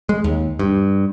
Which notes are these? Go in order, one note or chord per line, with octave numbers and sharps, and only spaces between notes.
G#3
D#2
G2